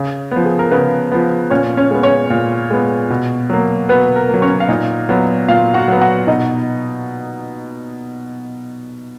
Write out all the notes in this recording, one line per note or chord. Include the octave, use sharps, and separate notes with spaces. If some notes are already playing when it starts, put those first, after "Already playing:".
Already playing: C#3
F3 B3
G#4
A#4
C#3 B3 B4
F3 B3
A#2 C#4 C#5
C#4 C#5
G#3 B3
C#4 C#5
A#2
G#3 B3
B2
F#3 A#3
B2 B3 B4
A#4
F#3 A#3
C#4 C#5
F5
A#2 D#4 D#5
F#3 B3
A#2 F4 F5
F#4 F#5
F#3 B3
F#4 F#5
B2 D#4 D#5